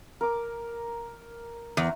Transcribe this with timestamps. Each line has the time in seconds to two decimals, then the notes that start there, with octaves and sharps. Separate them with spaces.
0.21 A#4 D6
1.77 E2